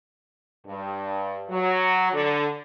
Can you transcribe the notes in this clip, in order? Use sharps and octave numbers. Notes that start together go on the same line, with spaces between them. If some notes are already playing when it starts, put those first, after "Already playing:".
G2
F#3
D3